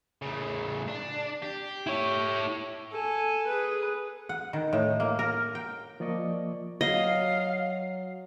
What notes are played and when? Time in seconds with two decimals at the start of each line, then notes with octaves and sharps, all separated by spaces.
0.22 A2 C#3
0.88 D4
1.43 G4
1.87 E4 C#5
2.91 A4 G#5
3.47 G#4 B4
4.29 F#5
4.53 D#3
4.73 A2
5.00 A#3
5.19 A#4
5.55 G5
6.00 F3 A#3 D5 D#5 C#6
6.81 F#3 D#5 F5